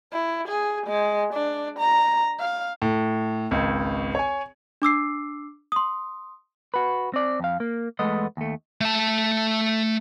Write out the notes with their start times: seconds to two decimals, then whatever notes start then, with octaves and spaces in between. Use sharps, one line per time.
0.12 E4
0.48 G#4
0.87 G#3
1.34 D4
1.79 A#5
2.39 F5
2.82 A2
3.51 G#1 C#2
4.15 C#5 G#5
4.82 D4 D6 E6 C7
5.72 C6 D#6
6.74 F#4 B4
7.14 C4 D5
7.40 F2 F5
7.60 A#3
7.99 E2 G#3 A3 B3 D#5
8.37 D#2 A3
8.81 A3 A5